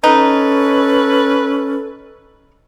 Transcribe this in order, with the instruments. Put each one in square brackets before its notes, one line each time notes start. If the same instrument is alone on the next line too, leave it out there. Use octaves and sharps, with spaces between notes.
[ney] C#4 [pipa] D#4 [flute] A4 [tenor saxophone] B4